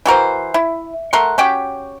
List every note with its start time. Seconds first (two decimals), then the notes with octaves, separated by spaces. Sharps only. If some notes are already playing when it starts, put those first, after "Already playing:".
0.06 E3 F#4 A#4 C5
0.54 E4
1.13 A3 A#4 F#5 C6
1.38 C#4 F#4 G4 G5